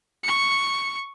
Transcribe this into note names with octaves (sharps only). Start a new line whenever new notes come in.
C#6 C#7